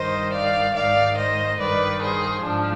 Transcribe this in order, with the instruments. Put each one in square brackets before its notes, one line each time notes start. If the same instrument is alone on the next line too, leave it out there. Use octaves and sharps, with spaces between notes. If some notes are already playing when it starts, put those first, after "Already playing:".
Already playing: [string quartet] G2 D#3 C5 D#5
D5 F5
G#2 D#3 D5 F5
C5 D#5
G2 D#3 B4 D5
G#4 C5
G#2 F3 D4